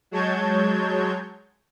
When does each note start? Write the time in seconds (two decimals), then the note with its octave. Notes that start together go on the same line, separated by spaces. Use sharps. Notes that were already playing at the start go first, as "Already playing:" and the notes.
0.11 F#3 G#3 C#5 A5 G6 G#6